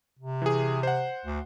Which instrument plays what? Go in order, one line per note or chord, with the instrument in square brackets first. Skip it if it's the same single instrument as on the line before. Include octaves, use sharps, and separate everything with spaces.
[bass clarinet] C3
[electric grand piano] E3 G#4
C5 F#5
[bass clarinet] D2